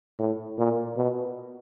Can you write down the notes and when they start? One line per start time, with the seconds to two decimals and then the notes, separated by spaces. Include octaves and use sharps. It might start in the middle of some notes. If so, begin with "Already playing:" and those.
0.19 A2
0.58 A#2
0.97 B2